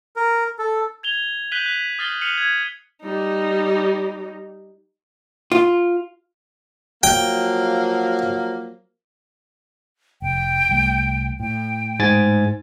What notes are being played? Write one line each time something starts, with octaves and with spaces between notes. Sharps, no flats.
A#4
A4
G#6 F7 G7
F#6 G6 B6 D#7 F#7 G7
F#6 B6
D#6 F6 A6 C7 F#7 G7
F6 C7 C#7 D#7 F7 F#7
G#6
G3 D#4
F4
F3 F#3 A#3 G5
F1 G5
C2 G3 A3
A2 G5
G#2 G#5 A6